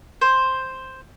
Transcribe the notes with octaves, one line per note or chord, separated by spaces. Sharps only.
C5